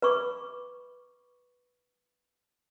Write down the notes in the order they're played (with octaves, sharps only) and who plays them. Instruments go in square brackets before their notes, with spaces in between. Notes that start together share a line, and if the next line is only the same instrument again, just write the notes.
[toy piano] B4 B5 C#6 D6